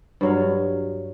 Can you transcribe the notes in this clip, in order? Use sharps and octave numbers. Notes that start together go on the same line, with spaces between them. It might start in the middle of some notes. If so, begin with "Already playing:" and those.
G2 F#3 F5